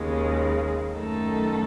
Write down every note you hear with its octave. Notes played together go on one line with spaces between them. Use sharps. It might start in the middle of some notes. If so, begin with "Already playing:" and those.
Already playing: D#2 C#3 G#3
F#2 D#3 A3 D#4 A4